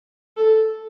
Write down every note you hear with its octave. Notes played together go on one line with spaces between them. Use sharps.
A4